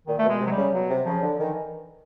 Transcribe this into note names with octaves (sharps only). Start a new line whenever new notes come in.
A#2 D#3
A3
B2 G#3
C3
F#3
G3
C#3
B2 F#3
C3
C#3 F3
D3
D#3 E3